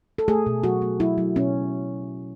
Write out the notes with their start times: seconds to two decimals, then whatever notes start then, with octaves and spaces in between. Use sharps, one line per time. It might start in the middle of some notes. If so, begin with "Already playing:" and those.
0.18 A4
0.28 A3 G#4
0.46 B2
0.64 F#3 F#4
0.82 A3
1.00 F#3 E4
1.18 F#3
1.36 B2 C#4